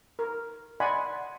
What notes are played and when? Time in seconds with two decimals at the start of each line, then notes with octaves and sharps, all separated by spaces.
0.19 A#4
0.80 D5 D#5 F#5 G#5 B5 C6